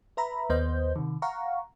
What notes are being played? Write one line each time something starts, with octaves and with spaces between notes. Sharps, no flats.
B4 E5 A#5 B5
D#2 B3 C5 D#5 G6
C3 D#3
F5 F#5 A#5 C#6